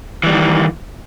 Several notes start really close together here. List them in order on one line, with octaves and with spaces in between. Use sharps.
E3 G3 D#3